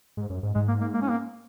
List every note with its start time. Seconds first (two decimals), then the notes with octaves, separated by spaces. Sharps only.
0.17 G#2
0.30 F#2
0.43 G#2
0.55 G#2 G#3
0.68 A#3
0.81 A#3
0.94 A#3
1.02 C#4
1.09 A#3